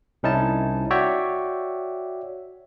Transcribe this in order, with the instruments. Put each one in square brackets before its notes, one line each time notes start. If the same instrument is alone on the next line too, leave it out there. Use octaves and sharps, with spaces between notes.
[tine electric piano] C2 C#4 D#4 E4 A5
F#4 C#5 D5 E5 G5